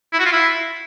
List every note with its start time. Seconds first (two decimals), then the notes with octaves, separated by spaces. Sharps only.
0.13 E4
0.19 F#4
0.25 F4
0.31 E4